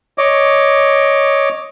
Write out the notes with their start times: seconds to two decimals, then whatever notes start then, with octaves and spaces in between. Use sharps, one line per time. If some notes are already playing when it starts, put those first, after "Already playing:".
0.18 C#5 D#5 D6